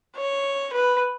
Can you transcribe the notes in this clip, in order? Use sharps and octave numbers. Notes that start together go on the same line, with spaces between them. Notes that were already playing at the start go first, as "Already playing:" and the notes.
C#5
B4